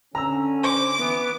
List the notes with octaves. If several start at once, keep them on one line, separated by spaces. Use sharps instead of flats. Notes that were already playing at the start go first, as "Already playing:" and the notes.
D3 C#4 A#5 E6
C5 D6
E3 B3